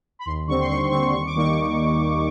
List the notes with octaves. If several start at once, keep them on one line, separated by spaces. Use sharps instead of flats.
B5
D#2 C6
D3 G3 C4 C#6
C6
D#2 C#6
D3 G3 C4 C#6
D#2 C#6
D6
D#3 G3 A#3 D#4 C#6